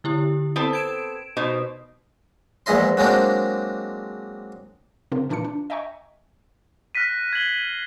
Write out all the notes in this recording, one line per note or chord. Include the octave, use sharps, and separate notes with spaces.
D3 E4 G4
B3 C4 E4 A4
G#6 D7 E7
B2 D#4 C5
A#1 E2 G#3 E4 D#5 C6
F#3 G#3 A#3 C4 D4
C#3 F#3 C4 D4 F4 A#4
A#2 E3 D4 D#4 F4 C#7
D4
D#5 E5 G5 G#5 A#5 C#6
F6 F#6 A#6 B6 D#7
G#6 C7 F#7 G7